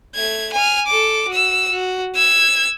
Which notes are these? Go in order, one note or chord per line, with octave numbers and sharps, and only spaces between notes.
A3 G#6
G#5 F6
A4 D6
F#4 E6
F#4
E6 G#6